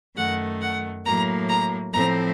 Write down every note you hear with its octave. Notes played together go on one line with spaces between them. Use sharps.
F#2 D#3 A3 F#5
F#5
A2 F#3 A#3 A#5
A#5
A2 F3 A3 C4 A#5